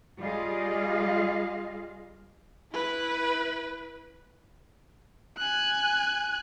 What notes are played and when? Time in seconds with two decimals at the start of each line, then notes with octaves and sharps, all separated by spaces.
0.20 G3 F4 G#4 D#5 F5
2.72 E4 B4
5.37 G#5 F#6